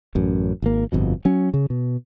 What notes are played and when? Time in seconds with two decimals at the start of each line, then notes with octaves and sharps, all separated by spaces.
0.15 A1 F#2
0.62 G#1 A#3
0.92 G1 F2 B2
1.25 F#3 C#4
1.54 C#3
1.70 B2